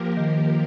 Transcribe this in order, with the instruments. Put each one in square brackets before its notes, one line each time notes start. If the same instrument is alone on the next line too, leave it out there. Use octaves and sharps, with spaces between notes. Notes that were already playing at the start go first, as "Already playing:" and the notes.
Already playing: [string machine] F3 A#3 G4 A#4
[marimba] D#3